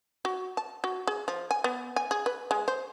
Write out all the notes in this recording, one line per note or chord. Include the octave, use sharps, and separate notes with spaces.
F#4
A5
F#4
G#4
F3
G#5
B3
G#5
G#4
B4
G#3
C5